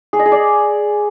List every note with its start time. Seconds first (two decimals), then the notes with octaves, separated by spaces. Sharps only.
0.13 G#4
0.19 D#5
0.26 G#4
0.32 D5